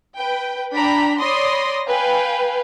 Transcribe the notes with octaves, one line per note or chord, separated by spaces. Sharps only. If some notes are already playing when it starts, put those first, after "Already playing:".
B4 G5
D4 G5 A#5 B5 B6
C#5 D5 B5 C6 D#6 A#6
B4 F5 G5 G#5